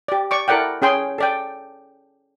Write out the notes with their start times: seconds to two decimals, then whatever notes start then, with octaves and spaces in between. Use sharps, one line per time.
0.08 G4 D5
0.31 D5 C#6 D6
0.48 E4 A4 A#4 D5 F#5 G5
0.82 C#4 G#4 G5 C6
1.18 A4 D5 G5